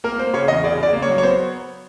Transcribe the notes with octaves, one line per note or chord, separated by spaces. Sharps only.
A#3 A#4
A#3 C5
C#3 C#5
E2 D#5
C#3 D5
C#3 D5
A#3
C#5
F#3
C#5
B3 C5